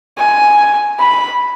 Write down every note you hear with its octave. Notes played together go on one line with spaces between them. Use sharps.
G#5
B5